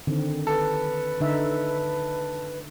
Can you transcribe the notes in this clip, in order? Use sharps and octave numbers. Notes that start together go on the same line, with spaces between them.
D3 D#3 C4
A4 B4
D3 D#4 E5